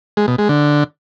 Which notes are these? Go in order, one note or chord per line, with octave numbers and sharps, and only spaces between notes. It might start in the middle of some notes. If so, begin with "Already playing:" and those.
G#3
B2
G#3
D3